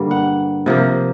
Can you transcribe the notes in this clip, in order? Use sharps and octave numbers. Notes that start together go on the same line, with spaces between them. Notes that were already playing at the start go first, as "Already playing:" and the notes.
Already playing: G2 D3 G3 A#3
F#5
C3 F3 A#3